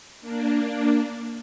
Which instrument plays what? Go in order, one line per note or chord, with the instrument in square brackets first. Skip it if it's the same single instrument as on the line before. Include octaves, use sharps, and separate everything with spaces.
[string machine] A#3 D4